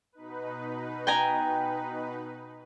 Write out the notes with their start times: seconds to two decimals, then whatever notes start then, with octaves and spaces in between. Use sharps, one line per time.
0.13 B2 D#4 B4
1.07 G5 G#5 A#5